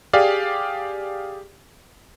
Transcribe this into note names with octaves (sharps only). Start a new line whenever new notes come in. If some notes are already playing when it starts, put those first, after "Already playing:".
G4 G#4 D5 F5